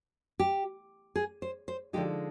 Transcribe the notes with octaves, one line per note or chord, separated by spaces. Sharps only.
G4
G#4
C5
C5
D3 F3 G#3 D#4 G4